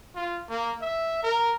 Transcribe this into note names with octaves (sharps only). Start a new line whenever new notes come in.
F4
A#3
E5
A#4